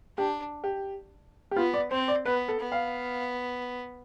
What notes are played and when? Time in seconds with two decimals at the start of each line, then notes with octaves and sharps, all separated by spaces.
0.18 D4 G4
0.64 G4
1.51 G4
1.56 B3 F4
1.74 D5
1.91 C4 C5
2.08 D5
2.25 B3 B4
2.48 A4
2.60 B3
2.72 F5